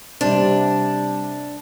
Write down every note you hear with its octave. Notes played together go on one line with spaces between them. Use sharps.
C3 G3 C4 D4